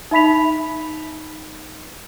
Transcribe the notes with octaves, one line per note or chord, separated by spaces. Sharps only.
D#4 E5 B5 B6 F7